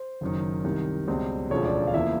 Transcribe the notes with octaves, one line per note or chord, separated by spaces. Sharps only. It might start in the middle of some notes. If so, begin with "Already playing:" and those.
Already playing: C5
F#1 F#2 D#3
C2 C3 D#3
C#2 B2 G3 C4
E1 D2 C#3 F3 C#5
D4 D5
F5
E2 C#3 F3 A#3 E4 E5